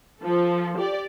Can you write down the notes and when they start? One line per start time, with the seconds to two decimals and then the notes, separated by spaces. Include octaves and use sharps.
0.21 F3 A4
0.78 G4 D5